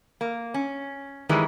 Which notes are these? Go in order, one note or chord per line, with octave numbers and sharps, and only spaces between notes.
A#3
C#4
G2 D#3 E3 G3 G#3